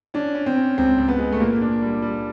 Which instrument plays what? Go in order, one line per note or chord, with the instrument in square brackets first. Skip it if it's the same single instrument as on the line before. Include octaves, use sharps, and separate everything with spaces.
[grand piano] C#4 [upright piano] D4
[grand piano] C#4
[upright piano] C4
[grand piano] C#4
[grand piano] C#2 [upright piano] C4
[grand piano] C#2
[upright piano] B3
[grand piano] G#3
[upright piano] A3
[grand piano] A#2 [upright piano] A#3
[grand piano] D4
G3
G3